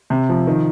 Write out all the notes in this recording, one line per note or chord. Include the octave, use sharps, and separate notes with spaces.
C3
F3
D#3